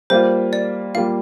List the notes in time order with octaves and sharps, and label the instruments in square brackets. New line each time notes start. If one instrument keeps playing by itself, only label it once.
[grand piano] G3 A#3 F4 [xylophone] C5
[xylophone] D5
[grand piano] G3 A#3 F4 [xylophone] F5